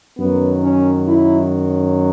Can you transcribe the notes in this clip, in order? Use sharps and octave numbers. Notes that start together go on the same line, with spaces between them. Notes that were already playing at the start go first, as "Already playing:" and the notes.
F#2 D#3 F#3 B3
C#4
E4